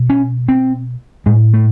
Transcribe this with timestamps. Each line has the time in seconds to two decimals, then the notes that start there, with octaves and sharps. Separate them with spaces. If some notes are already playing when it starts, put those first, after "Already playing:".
Already playing: B2
0.10 C#4
0.48 C4
1.26 A2 G#3
1.53 A3